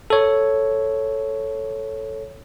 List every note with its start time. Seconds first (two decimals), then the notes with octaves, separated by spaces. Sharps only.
0.10 A4 C#5